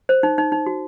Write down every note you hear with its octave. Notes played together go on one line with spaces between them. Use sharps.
C5
D#4
D#4
D#4
F#4